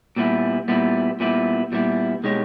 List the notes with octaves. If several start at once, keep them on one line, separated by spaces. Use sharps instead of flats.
A#2 G3 B3 E4
A#2 G3 B3 E4
A#2 G3 B3 E4
A#2 G3 B3 E4
B2 G#3 D#4 G4 C#5